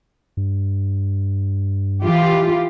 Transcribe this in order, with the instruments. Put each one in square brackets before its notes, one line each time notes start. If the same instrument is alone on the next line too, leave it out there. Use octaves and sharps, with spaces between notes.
[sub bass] G2
[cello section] E3 F4 G4